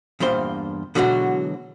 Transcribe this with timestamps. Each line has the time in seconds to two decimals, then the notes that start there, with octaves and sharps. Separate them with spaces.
0.20 E2 G2 A#2 C5
0.95 B2 D3 E3 F#3 G#3 F#4